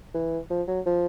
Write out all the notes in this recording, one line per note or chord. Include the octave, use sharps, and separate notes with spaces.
E3
F3
F#3
F3